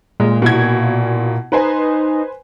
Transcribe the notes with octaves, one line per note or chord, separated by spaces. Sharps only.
A#2 G#3
B2 E4 G#6
D#4 B4 C5 G#5